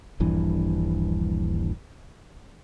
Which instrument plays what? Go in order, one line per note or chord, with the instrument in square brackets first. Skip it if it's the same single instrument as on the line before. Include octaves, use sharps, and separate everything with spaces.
[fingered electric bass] D#1 A#1 G2 E3